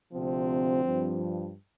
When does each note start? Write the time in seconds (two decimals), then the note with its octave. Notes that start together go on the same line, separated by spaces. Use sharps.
0.13 D2 C3 F3 C4
0.84 G2 F3